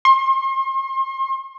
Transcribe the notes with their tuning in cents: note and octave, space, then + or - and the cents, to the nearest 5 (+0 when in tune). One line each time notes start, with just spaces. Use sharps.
C6 +35